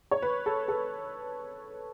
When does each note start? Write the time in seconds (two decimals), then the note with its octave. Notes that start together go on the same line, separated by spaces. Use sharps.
0.11 C#5
0.22 B4
0.46 A4
0.68 A4